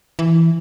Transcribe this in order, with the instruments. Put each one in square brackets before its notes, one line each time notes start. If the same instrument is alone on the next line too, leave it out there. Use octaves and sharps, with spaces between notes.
[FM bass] E3